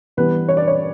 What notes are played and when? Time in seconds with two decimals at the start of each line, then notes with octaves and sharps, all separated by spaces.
0.17 E3 G3 B3 B4
0.48 C#5
0.57 D5
0.67 C#5